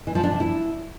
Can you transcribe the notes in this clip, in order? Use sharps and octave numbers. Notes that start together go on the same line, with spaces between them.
E3
F3
D4
C3
E4